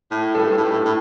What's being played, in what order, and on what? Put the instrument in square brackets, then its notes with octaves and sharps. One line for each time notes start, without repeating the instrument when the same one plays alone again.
[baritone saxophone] A2
[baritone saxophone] G2 [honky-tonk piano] A4
[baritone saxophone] A2
G2
A2
G2
A2
A2